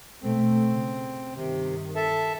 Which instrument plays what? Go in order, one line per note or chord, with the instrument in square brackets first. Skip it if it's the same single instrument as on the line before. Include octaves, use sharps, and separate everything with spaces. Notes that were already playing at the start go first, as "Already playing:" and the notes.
[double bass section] B2 A3 [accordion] C4
[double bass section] C#3
[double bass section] G2 D#3 [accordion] C3
[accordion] A4 E5 A5